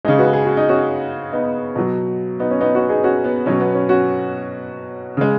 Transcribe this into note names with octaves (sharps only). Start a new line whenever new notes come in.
C#3 G#3 D#4 G#4
F#4 B4
G#4
F#4
D#4
C#4 F#4
B3 D#4
B2 F#3
B3 D#4
C#4
B3 D#4
C#4 F#4
D#4 G#4
C#4 F#4
B3
B2 F#3 C#4
B3
C#4
C#4 F#4
C#3 G#3